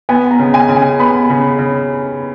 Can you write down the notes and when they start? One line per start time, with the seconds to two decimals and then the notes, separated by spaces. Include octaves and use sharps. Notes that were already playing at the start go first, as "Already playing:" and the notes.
0.09 B3 G#5
0.31 A#5
0.39 C#3
0.54 G#5
0.69 C#3
0.76 G#5
0.99 B3 B5
1.30 C#3
1.59 C#3